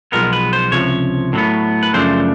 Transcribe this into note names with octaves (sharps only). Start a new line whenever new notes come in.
B1 A2 F3 G#3 B3 A#4
B4
C5
C#2 C3 F3 C#5
A2 F#3 B3
B4
F#2 C#3 F3 A3 D4 C5